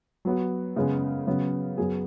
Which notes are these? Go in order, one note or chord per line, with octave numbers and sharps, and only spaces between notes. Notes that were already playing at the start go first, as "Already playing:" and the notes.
F#3 B3 F#4
F#2 C#3 G#3 B3 G#4
C#3 F#3 B3
F#2 F#3 B3 G#4